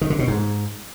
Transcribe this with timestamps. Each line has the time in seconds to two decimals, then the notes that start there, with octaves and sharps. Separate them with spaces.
0.01 D#3
0.10 D3
0.19 B2
0.28 G#2